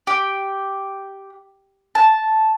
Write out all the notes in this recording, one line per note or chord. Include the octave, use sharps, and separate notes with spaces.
G4
A5